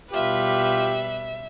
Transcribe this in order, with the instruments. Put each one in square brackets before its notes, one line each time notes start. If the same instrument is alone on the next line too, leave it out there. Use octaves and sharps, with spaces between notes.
[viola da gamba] B2 G3 B4 [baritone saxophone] F4 [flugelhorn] G4 [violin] E5